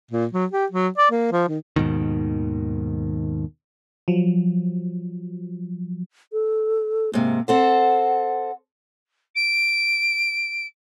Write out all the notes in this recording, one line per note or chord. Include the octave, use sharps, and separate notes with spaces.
A#2
F#3
G4
F#3
D5
A#3
F3
D#3
D#2 G#2 B2 D#3
F3 F#3
A4
G#2 C3 A#3
C4 A4 C5 F#5
D7